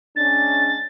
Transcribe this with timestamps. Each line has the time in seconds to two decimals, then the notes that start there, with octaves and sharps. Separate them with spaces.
0.16 G#3 C#4 D4 A6